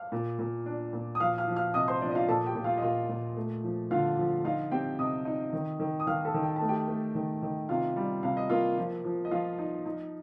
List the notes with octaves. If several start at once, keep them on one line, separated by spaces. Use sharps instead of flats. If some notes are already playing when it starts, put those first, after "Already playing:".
Already playing: F5 F6
A#2
A#2
D4
A#2
D#6
F3 F5 F6
F5 F6
F3
F5 F6
C3 D#5 D#6
C5 C6
F3 D4 D5
D#5
F4 F5
A#2 A4 A5
G4 G5
A#2
F4 F5
D#5
A#2 F4 F5
A#2
A3
F3
D3 F4 F5
F3
D#4 F4 F5
C4 G4 G5
C3 D#5 D#6
D#4
D#3
D#3
D#6
D#3 F5 F6
A4 A5
D#3
G5
A5
A3
G4 G5
A3
D#3
D#3
C3 F4 F5
G3
C3 F5
D#5
A#3 F4 F5
F3
F3
D#5
F3 F4 F5
D#4
D#4